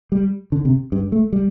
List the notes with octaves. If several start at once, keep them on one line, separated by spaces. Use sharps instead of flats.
G3
D3
C3
G2
A3
G3